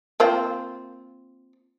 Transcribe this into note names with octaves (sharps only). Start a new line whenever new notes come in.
A#3 C4 F4